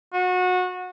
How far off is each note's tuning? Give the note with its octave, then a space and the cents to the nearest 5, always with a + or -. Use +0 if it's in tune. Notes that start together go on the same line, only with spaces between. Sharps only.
F#4 -25